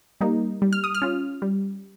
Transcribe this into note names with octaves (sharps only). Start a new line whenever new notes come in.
G3 A#3 D#4
G3
F6
D#6
F6
C#4 F4
G3